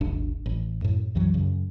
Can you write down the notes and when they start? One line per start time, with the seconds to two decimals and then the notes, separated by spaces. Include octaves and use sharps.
0.01 D#1 G#1 D4
0.46 A1
0.82 F#2 A2
1.15 C2 F#2 E3 F#3
1.34 F#2 C#3